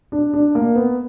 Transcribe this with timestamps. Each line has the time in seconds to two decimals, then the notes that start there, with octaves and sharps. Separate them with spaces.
0.12 D4
0.34 D4
0.55 A#3
0.75 B3